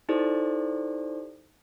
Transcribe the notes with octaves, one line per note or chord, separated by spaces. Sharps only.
D#4 E4 G4 A4 C5 D5